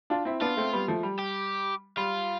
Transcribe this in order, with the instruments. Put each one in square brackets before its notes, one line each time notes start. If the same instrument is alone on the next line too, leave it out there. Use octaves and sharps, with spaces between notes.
[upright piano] D4 F4
C4 E4
[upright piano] B3 D4 [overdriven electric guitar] F4
[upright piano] A3 C4
G3 B3
F3 A3
G3
[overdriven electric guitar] G4
[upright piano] G3 [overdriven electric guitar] F4